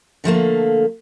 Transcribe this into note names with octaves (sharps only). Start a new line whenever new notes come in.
D3 F3 A3 A#3